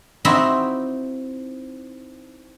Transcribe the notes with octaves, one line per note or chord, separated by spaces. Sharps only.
C4 D#4 E4 F#4 F#5 B5